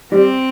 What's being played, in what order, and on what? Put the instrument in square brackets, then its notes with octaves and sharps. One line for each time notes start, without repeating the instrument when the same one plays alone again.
[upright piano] G3 [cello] C4